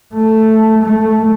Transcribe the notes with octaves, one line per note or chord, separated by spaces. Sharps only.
A3
A3